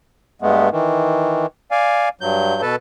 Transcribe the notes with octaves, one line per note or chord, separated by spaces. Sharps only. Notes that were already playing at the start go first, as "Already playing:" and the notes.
G2 G#3 A3 B3
D#3 E3
D5 F5 G#5
G2 F#3 G6
B2 A4 B4 A5